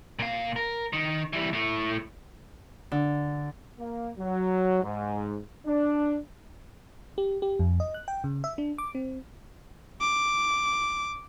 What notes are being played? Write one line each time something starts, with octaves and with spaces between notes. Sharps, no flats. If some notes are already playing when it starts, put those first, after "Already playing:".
A#2 F5
A#4
D#3
E3 G3
A2 A3
D3
A#3
F#3
G#2
D4
G4
G4
F2
D#5
F#6
G5
C#3
E5
D4
D6
C4
D6